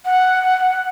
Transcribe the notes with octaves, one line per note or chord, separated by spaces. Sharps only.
F#5